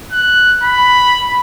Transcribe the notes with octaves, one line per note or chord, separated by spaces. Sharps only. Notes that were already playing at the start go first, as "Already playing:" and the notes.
F#6
B5